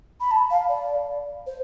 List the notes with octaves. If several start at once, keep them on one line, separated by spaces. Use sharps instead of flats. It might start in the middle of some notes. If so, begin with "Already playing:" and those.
B5
A5
F5
D5
C5